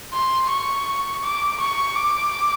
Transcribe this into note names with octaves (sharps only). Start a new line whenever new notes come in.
C6
C#6
D6
C#6
D6